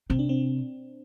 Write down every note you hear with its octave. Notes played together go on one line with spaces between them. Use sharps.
C3 C4
D4
C4